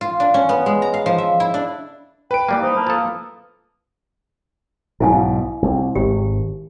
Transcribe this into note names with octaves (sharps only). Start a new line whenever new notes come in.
F4
D4
C#4
B3
G#3
A#5
F5
F3
E5
E4
D4
B4 G5 D7
E3 G3 A#3
D#4 C5
A#3 A5
F3 A4 D#6
B1 G#2 B2 E4 F5 G#5
C2
G#1 G4